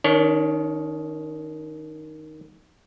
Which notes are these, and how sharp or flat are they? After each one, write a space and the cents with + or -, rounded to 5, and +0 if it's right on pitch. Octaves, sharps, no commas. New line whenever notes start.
D#3 +0 D4 -45 C#5 +0